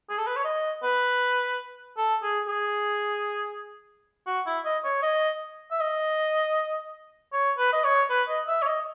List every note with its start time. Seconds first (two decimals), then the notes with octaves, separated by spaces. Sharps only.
0.10 G#4
0.18 A4
0.27 B4
0.36 C#5
0.45 D#5
0.83 B4
1.97 A4
2.23 G#4
2.48 G#4
4.27 F#4
4.46 E4
4.65 D#5
4.85 C#5
5.03 D#5
5.71 E5
5.80 D#5
7.33 C#5
7.58 B4
7.73 D#5
7.84 C#5
8.10 B4
8.29 D#5
8.48 E5
8.62 C#5
8.67 D#5